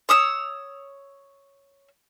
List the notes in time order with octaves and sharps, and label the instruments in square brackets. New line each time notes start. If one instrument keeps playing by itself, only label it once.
[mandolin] C#5 D#6 E6